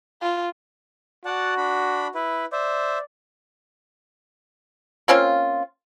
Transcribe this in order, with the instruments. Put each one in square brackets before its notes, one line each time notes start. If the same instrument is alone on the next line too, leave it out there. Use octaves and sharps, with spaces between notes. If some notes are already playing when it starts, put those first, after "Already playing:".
[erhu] F4
[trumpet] F#4 [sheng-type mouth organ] D5 F#5 A5
[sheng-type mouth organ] D4 B5
E4 B4
[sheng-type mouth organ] C5 E5 [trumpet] D5
[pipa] A#3 C4 C#4 F4